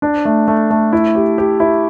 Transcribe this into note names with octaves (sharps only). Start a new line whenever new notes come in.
D4
A3
A3
A3
E4
G4
G4
E4